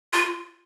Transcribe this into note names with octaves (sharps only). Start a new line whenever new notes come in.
F4